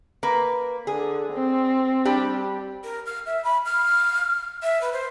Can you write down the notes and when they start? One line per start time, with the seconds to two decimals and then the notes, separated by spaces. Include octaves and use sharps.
0.23 A#3 B4
0.87 D3 G#4
1.33 C4
2.05 G3 D4 G4
2.84 A#4
3.06 F6
3.26 E5
3.44 B5
3.66 F6
4.62 E5
4.81 B4
4.93 C5